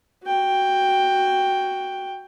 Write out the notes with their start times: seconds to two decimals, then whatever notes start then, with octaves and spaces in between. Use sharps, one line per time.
0.25 F#4 G5